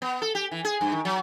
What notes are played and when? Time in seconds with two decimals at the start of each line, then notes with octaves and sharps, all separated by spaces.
0.02 B3
0.22 A4
0.35 G4
0.51 E3
0.65 G#4
0.81 G2
0.92 D#3
1.05 F#3